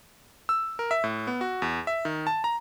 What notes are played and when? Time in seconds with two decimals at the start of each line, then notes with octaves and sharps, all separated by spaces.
0.49 E6
0.79 A#4
0.91 E5
1.04 A2
1.27 B3
1.41 F#4
1.62 E2
1.87 E5
2.05 D#3
2.27 A5
2.44 A#5